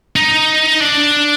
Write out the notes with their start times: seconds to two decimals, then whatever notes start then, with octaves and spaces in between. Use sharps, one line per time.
0.16 D#4
0.80 D4